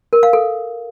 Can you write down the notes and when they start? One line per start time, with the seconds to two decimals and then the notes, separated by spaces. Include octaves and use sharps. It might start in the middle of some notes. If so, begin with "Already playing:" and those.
0.13 A#4
0.23 F5
0.33 A4